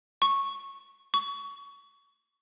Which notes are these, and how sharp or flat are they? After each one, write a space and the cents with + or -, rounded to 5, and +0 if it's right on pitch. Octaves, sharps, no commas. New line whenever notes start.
C#6 -10
C#6 +20